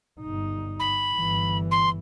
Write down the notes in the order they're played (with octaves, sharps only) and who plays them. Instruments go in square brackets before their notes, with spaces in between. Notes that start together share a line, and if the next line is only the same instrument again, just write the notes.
[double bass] G1 D#4
[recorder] B5
[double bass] G1 E3
[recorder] C6